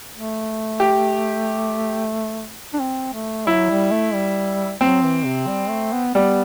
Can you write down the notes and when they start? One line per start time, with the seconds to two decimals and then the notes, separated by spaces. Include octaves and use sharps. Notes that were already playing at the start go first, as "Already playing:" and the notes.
0.13 A3
0.80 G4
2.74 D4
2.80 C4
3.14 A3
3.47 F#3 E4
3.70 G3
3.92 A3
4.14 G3
4.81 F#3 C4
5.03 E3
5.25 C3
5.47 G3
5.69 A3
5.93 B3
6.15 G3 B3